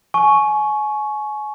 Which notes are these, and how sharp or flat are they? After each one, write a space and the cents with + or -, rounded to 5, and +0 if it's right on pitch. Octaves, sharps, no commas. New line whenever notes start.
G#5 +30 C#6 +0